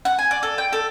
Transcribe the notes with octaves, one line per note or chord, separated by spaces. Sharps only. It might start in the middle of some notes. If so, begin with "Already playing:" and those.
F#5
G#5
D5
A4
G5
A4